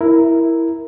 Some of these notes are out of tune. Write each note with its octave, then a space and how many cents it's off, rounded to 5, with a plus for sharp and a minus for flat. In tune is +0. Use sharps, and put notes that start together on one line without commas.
E4 +0 A#4 +0